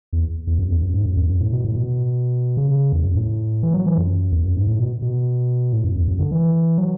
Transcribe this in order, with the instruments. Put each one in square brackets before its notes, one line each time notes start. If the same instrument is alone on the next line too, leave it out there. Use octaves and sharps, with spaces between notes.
[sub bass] E2
E2
F#2
E2
F#2
G#2
F#2
E2
F#2
A2
B2
A2
B2
C#3
E2
F#2
A2
E3
F#3
E3
F#2
E2
F#2
G#2
A2
B2
B2
A2
F#2
E2
F#2
D3
E3
F#3